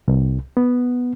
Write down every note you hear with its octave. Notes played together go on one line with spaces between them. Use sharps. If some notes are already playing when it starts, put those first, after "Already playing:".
C2
B3